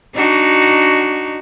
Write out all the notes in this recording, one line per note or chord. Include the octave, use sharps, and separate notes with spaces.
D4 D#4 F#4